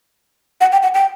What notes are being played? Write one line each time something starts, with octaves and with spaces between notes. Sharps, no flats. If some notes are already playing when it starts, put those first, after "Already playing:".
F#5
G5
F#5
G5